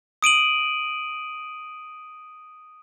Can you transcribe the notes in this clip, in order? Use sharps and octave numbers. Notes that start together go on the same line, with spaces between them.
D#6 D7 D#7 F#7